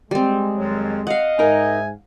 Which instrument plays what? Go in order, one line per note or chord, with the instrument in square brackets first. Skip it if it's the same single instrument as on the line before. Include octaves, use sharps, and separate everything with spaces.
[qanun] G3 C4 [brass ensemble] G#3
[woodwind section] F2 D#3 F#3
[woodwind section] D#5 [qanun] F5 F#5
[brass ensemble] G#2 E5 G#5 [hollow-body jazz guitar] D#4 A#4